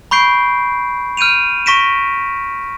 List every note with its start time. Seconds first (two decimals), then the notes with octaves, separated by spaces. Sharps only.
0.11 B5 C#6 G6 C7 D7
1.17 F6 G6 D7 D#7 F7
1.66 C#6 A#6 B6 D7 E7